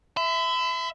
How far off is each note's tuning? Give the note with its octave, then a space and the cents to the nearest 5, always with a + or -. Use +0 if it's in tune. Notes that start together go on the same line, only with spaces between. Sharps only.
E5 +0 B5 +45